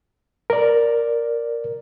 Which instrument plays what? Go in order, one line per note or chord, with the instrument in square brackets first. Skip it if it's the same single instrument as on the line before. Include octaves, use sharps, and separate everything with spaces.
[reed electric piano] A#4 D5